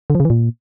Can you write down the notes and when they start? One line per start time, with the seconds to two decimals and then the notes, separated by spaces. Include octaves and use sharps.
0.10 D3
0.15 F3
0.20 C#3
0.25 E3
0.30 A#2